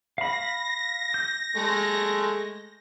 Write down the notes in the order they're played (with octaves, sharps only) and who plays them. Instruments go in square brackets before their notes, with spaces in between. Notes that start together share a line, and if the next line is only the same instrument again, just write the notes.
[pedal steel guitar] F5 B5 [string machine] A#6
[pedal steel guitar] G6
[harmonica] G#3 A3